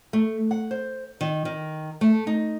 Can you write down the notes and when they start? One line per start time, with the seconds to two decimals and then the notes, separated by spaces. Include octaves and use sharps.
0.13 A3
0.51 F#5
0.71 C5
1.21 D#3
1.45 D#3
2.01 A3
2.27 D#4